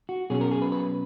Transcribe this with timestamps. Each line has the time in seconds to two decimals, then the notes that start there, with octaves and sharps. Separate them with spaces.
0.09 F#4
0.30 B2 F#3 C#4 G#4
0.41 A#4
0.51 G#4
0.62 B4
0.72 B4